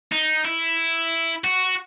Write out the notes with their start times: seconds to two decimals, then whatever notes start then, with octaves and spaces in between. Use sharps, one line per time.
0.12 D#4
0.45 E4
1.44 F#4